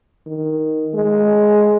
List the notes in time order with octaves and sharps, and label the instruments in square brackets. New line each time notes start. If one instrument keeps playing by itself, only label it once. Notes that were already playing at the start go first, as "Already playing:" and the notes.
[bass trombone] D#3
G#3